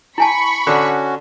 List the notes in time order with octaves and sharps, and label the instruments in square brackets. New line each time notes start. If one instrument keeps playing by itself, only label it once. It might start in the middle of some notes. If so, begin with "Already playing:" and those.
[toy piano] E4 G#5 A5 [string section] B5 C#6
[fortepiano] D3 [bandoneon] C#4 F#4